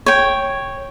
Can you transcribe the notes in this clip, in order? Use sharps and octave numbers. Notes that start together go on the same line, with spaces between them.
C#5 G5